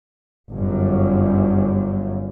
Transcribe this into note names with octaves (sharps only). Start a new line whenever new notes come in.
G1 F#2